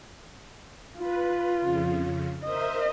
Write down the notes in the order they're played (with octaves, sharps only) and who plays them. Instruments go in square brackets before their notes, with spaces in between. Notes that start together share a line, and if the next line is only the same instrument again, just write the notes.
[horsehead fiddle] F4 [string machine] B4
[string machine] F2 C#3
[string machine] A#4 C5 E5 [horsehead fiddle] D#5